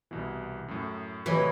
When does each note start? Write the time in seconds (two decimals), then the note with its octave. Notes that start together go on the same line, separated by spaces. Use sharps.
0.11 C2 B2 E3
0.68 F#2 A2
1.26 A2 C3 E3 F#3 B4 C#5 D#5